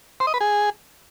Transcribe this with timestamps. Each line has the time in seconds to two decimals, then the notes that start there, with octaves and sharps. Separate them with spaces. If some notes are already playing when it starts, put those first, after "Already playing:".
0.20 C5
0.27 D#5
0.34 B4
0.41 G#4